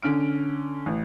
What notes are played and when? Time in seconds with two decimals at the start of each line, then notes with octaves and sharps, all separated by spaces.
0.02 D3 C#4 F6 D7
0.86 A1